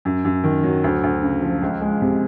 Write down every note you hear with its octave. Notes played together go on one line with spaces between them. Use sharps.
F#2
F#2
D#3
F#3
D2
D2
C#3
F3
C#2
G#3
C3